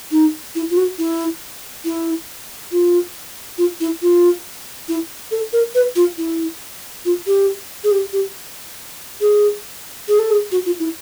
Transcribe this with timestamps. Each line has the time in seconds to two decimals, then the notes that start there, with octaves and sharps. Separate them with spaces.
0.11 D#4
0.55 E4
0.70 F4
0.77 F#4
0.98 E4
1.85 E4
2.72 F4
3.58 F4
3.80 E4
4.02 F4
4.89 E4
5.31 A4
5.53 A#4
5.75 B4
5.96 F4
6.18 E4
7.05 F4
7.27 G4
7.84 G#4
7.91 G4
8.13 G4
9.21 G#4
10.08 G#4
10.19 A4
10.30 G#4
10.52 F#4
10.66 F4
10.80 E4